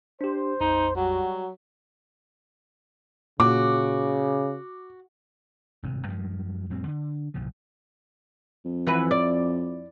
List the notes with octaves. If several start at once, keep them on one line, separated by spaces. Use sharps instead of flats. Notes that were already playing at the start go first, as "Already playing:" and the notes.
D4 G4 C5
A#1 F2 D#4
F#3 G3 F#4
A#2 C#3 F#4 D6
D#1 G#1 G2 C3
F#2 F3 G3 G#3
F2 A2 G3 C4
D3
F#1 C2 A#2 F3
F2
E3 F#4 B4
D5